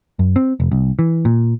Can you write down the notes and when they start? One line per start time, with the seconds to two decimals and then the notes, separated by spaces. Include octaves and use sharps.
0.19 F#2
0.36 C4
0.60 F1
0.72 C2
0.99 E3
1.25 A#2